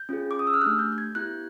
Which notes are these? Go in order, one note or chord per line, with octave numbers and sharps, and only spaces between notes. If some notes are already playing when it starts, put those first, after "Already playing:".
Already playing: G6
C#4 F4 G#4
D6
D#6
E6
F6
A3 D4 G4 F#6
G6
G6
G#6
B3 E4 G4 F#6